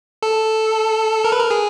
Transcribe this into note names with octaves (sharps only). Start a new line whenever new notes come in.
A4
A#4
B4
A#4
G#4